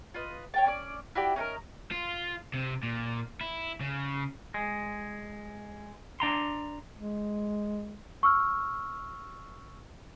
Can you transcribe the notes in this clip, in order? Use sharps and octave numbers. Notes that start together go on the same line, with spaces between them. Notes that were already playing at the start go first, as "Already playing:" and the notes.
F4 B4 D#5
C#5 G5 A5
C#4 D5
E4 F#4 G4 D5
C#4 D#4 A4 A#4
F4
C3
A#2
E4
C#3
G#3
D4 A#5 C6
G#3
C#6 E6 F6